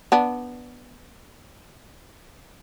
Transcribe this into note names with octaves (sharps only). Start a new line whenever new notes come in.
B3 D4